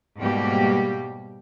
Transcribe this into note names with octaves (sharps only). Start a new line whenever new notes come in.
G#2 B2 G3 A#3 G4